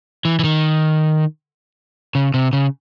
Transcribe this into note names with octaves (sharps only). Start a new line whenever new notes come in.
E3
E3
D#3
C#3
C3
C#3